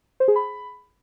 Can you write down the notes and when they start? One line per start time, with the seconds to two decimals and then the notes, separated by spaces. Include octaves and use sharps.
0.20 C5
0.28 G#4
0.36 B5